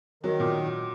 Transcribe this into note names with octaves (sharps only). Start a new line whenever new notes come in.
D#3 F#3
A#2